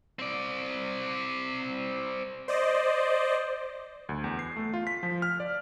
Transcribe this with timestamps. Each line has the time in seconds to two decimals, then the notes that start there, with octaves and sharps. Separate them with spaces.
0.19 C4 D5
2.48 C5 D5 D#5
4.09 D2
4.24 E2
4.39 C7
4.57 A3
4.74 F4
4.87 B6
5.03 F3
5.22 F6
5.40 D5